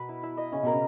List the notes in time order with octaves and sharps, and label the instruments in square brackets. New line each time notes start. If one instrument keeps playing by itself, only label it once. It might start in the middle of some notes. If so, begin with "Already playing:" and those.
Already playing: [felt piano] B2 [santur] B4
[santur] E4
E4
D#5
[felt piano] C#3 [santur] C#4
[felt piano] B2 [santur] A#4
[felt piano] C#3